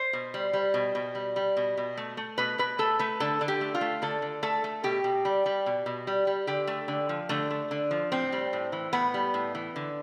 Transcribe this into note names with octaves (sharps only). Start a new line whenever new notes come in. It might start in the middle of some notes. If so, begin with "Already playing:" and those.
Already playing: C5
B2
G3
G3
B2
B2
G3
G3
B2
B2
A3
A3
B2 B4
B2 B4
A3 A4
A3 B4
D3 A4
D3
G4
A3
F4
A3
D3 A4
D3
A3 A4
A3
B2 G4
B2
G3
G3
B2
B2
G3
G3
D3 G4
A3
D3
F3
D3 A3
A3
D3
F3
A2 C4
G3
A2
E3
A2 B3
G3
A2
E3
D3